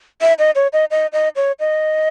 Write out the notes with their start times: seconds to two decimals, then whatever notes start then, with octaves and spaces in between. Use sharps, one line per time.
0.21 E5
0.39 D#5
0.55 C#5
0.73 D#5
0.91 D#5
1.13 D#5
1.36 C#5
1.60 D#5